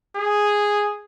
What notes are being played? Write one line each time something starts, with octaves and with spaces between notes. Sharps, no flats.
G#4